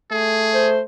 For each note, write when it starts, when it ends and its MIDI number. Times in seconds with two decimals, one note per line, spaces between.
0.12 0.82 57
0.12 0.70 68
0.54 0.80 72